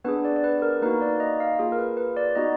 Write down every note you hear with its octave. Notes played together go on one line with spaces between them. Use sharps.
B3 D4 G#4 B4
D5
D5
B4
A#4
A#3 D#4 F#4 B4
D5
D#5
F5
A#3 F4 G#4
A#4
B4
B4
D5
B3 D#4 F#4 D#5